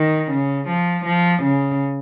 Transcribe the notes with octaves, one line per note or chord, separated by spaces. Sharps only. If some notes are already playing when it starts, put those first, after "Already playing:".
Already playing: D#3
C#3
F3
F3
C#3